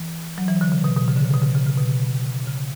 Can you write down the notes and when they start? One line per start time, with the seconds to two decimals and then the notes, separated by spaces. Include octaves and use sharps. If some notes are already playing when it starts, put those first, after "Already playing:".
Already playing: E3
0.38 F#3
0.48 E3
0.61 D3
0.72 C#3
0.84 B2
0.96 B2
1.08 C#3
1.16 D3
1.25 C#3
1.33 B2
1.42 C#3
1.55 C#3
1.66 C#3
1.78 B2
2.48 C#3